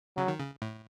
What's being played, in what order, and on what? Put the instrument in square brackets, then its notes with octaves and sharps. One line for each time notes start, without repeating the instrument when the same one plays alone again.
[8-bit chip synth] C#3 [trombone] F#3
[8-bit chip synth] D#3
C#3
A2